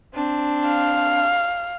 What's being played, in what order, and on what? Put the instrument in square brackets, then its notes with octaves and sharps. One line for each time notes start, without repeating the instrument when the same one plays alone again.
[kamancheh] C4 D4
[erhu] F5